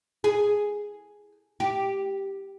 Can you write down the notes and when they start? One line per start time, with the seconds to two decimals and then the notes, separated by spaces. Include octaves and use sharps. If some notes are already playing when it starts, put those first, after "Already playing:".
0.24 G#4
1.60 G4